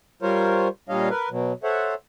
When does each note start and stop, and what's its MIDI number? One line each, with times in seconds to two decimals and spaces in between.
0.22 0.68 55
0.22 0.68 65
0.22 0.68 70
0.22 0.68 72
0.22 0.68 73
0.89 1.09 46
0.89 1.09 55
0.89 1.09 62
0.89 1.09 73
0.89 1.09 75
0.89 1.09 77
1.10 1.29 70
1.10 1.29 71
1.31 1.53 47
1.31 1.53 54
1.64 1.94 69
1.64 1.94 72
1.64 1.94 73
1.64 1.94 76
1.64 1.94 78